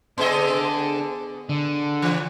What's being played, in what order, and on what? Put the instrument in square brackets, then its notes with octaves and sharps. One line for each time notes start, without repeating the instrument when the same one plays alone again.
[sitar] B3 G#4 D#5 [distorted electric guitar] D4 A4
[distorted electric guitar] D3
[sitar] E3